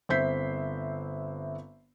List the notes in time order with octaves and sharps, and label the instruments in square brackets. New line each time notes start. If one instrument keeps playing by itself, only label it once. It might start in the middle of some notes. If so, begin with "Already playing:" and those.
[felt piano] G1 C4 E5 G6 B6 C7